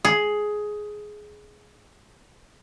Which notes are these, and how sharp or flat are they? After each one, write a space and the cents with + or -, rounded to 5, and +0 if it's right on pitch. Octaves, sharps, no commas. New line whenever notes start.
G#4 +10